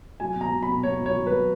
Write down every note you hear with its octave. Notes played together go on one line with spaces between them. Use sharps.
F#3 G#5
B2
A#5
F#3
B2 B5
B2 C#5
F#3
C#5
F#3
F#3 B4